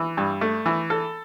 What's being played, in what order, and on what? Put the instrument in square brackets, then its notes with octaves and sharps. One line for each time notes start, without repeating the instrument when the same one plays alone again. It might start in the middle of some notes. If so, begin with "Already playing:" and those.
Already playing: [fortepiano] E3
G2
A3
E3
A4